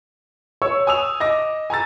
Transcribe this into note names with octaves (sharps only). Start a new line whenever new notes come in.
C#5 C#6 E6
G#5 D#6 E6 F7
D#5 D6 A#6
G#5 A#5 E6 A6